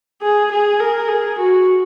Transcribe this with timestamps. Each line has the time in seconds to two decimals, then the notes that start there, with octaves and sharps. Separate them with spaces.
0.22 G#4
0.52 G#4
0.80 A#4
1.09 G#4
1.38 F#4